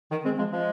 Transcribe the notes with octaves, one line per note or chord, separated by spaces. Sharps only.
D#3
G#3 C4
F3 G#3
F3 G#3